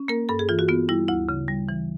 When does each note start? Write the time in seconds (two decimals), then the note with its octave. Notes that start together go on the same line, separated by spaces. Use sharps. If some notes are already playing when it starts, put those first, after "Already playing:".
Already playing: C#4
0.08 A#3 A#4
0.29 G2 A4
0.39 G#4
0.49 E3 F4
0.59 F#4
0.68 B3 F4
0.89 G3 E4
1.08 D2 E4
1.29 C#3
1.48 G3
1.69 E3